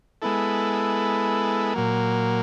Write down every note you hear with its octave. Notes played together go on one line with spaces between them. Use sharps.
G#3 B3 E4 A4
A#2 F#3 A#3